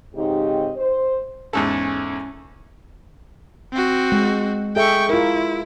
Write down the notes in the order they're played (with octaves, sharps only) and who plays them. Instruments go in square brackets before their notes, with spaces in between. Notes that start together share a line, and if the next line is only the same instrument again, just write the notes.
[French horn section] G#2 C#3 C4 D#4 G4 D#5
C5
[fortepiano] E2 G#2 A4 [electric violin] C#4
[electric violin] C4 F#4
[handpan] G#3
[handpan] G#4 A4 E5 [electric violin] G5 C#6
[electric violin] E4 [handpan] F4 A#4